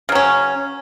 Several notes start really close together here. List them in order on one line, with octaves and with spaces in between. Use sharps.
C#3 F#3 C#4